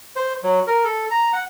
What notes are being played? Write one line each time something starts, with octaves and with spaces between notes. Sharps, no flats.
C5
F#3
A#4
A4
A#5
F#5